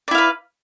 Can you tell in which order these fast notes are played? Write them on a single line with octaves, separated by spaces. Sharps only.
D5 E4 F5 B4